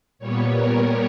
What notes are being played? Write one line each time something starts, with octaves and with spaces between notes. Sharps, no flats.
A#2 G3 B3 C#5
A#4